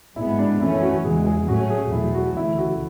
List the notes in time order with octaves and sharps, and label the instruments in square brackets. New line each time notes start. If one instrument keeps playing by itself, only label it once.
[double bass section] G#2 G#3 B3 [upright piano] E4
[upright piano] D4
[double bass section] F#2 E3 A3 C#4 [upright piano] E4
[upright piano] F#4
[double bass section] E2 C#3 E3 G#3 [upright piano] G#4
[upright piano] G#4
[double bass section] A2 F#3 A3 C#4 [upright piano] F#4
[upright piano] G#4
[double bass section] E2 B2 F#3 A3 [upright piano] E4
[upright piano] F#4
[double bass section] D2 C#3 E3 A3 [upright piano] E4
[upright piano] F#4